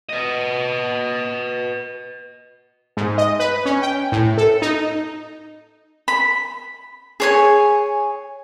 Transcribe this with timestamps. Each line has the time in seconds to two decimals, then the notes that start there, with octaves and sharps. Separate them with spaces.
0.09 B4 D#5
2.97 G#2
3.18 D#5
3.39 B4
3.66 C#4
3.82 G5
4.12 A2
4.38 A4
4.62 D#4
6.08 B5
7.20 G#4 C#5 G#5